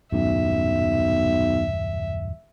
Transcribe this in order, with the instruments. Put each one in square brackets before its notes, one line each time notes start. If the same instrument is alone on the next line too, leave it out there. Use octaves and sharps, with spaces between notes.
[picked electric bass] D#1 F#2 A2 [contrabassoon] B1 [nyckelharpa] E5